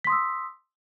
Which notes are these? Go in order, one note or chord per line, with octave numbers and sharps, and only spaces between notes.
C6 D#6 E6 B6